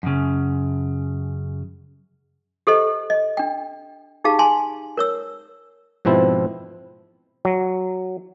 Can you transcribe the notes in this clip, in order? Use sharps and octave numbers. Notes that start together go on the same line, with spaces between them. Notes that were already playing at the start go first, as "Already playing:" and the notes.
F#2 C#3
G4 A4 C5 D#5
D#5
D4 G5
D#4 G4 G#4 F5 A5
G#5 A5 C6
A#4 C#5 E6
G#2 B2 F3 C4 E4
F#3